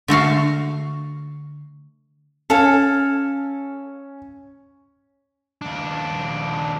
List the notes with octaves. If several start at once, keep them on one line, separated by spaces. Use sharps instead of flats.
D3 A3 F#4 F5
C#4 A4 F5 G#5
D#2 D4